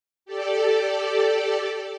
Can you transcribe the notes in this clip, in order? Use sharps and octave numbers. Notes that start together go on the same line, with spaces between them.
G4 A4 D5